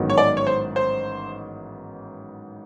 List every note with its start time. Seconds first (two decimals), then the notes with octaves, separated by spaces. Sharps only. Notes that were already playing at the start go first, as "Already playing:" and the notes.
Already playing: A1 G#2 D#3 F#3 B3
0.10 C#5
0.18 D5
0.37 C#5
0.47 C5
0.76 C5